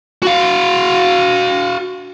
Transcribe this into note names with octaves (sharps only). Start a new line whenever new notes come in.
F#4 F5